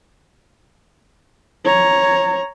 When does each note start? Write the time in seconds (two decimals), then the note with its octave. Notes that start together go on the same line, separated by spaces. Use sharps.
1.65 C#5 A#5